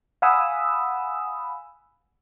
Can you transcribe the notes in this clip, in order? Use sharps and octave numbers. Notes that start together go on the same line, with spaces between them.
F5 F#5 G#5 B5 D#6 E6